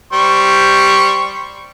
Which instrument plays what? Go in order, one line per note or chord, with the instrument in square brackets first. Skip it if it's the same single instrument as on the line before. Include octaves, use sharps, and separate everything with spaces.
[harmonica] G3 C5 C#6